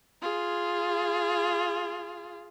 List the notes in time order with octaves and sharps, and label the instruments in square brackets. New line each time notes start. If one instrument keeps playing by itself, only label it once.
[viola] F4 G#4